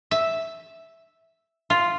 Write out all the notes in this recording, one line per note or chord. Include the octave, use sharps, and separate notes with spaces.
E5
F4